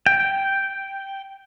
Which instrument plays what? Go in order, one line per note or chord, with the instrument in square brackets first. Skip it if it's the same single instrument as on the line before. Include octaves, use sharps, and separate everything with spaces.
[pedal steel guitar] G5